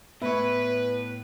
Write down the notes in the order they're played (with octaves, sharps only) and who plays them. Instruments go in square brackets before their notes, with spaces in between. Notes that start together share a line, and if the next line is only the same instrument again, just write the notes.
[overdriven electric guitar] A2 [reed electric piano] B3 [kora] E4 C#5 [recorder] B4